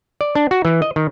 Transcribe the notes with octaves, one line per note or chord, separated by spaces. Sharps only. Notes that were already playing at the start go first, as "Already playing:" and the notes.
D5
D4
F#4
E3
D#5
D#3